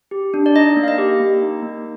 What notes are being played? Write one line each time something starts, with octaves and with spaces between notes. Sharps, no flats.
G4
D4
D5
D#4 D#5
A#3
F5
D#5
G4
A#3
D#4
A#3